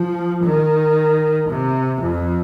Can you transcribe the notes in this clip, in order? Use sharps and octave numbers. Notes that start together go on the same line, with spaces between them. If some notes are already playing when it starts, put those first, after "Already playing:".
Already playing: F3
D#3
C3
F2